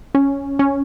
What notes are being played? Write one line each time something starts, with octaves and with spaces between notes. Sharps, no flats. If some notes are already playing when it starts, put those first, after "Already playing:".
C#4
C#4